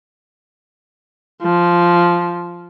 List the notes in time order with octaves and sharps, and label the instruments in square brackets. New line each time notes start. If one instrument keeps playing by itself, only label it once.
[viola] F3